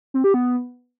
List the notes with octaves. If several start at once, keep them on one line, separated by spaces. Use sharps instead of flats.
C4
G4
B3